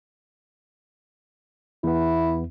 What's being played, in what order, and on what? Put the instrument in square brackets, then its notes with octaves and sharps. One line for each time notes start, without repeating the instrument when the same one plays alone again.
[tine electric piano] E2 B3 [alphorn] E4